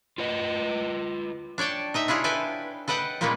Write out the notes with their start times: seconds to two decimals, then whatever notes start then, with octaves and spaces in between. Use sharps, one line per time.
0.18 F4 B4 D#5
1.58 D4 C#5 D5 G5 A5
1.94 D#4 D#5 E5
2.08 D4 E4 F4 G#4 C#5
2.24 E4 A4 B4 G5 G#5
2.88 A4 B4 D#5 F#5 G5
3.21 A#2 G3 G#3 A#3 C#4 B4